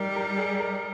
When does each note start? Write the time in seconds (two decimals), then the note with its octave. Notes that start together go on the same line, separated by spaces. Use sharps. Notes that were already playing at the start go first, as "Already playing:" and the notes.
Already playing: G3 D#4 A#4
0.16 A#4
0.38 G#4
0.60 A#4